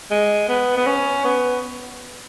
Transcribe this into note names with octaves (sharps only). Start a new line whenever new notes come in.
G#3
B3
B3
C#4
B3